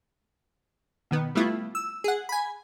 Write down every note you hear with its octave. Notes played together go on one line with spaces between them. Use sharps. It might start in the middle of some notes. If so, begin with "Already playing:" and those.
B2 D#3 B3
G3 A3 B3 E4 F4
E6
G#4 F#5
G#5 B5